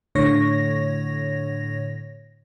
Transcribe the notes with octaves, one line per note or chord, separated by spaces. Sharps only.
A2 D3 C#5 A#6